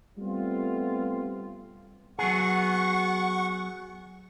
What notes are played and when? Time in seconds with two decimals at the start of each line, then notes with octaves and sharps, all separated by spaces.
0.18 G3 A3 B3 C4 F4
2.19 F#3 B3 G#4 F#5 C#6